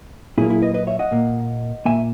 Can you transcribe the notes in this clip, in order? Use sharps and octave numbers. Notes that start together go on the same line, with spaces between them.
A#2 F#3 A#3 E4 G#4
E4 G#4
B4 D#5
B4 D#5
C#5 E5
D#5 F#5
A#2 A#3
A#2 A#3 E5 G#5